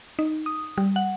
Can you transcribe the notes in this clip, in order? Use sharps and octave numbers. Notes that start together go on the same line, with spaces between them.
D#4
D#6
G3
F#5